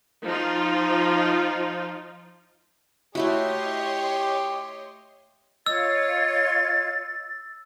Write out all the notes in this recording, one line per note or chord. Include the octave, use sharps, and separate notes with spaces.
F3 D#4 F4
A3 E4 F#4 G4 C#5 D#5 C6
F4 C#5 D#5 E6 A6